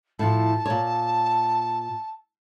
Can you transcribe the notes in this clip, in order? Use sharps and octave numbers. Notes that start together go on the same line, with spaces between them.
A2 F3 A5
A#2 C#5